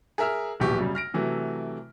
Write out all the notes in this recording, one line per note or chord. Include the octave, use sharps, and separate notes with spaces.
G#4 A#4 E5 E6 F6
D1 A#1 B2 E3 G4 C#6
F#2 C#3 G3
F6 A#6 D7
C3 E3 F#3 A3